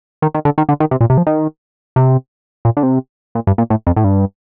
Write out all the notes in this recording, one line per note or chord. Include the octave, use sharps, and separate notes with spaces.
D#3
D#3
D3
D#3
D3
D#3
C3
A#2
C3
F3
D#3
C3
A#2
D3
C3
A#2
G2
A#2
A2
F2
A2
G2